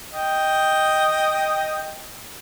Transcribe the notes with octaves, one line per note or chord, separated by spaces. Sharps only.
D#5 G5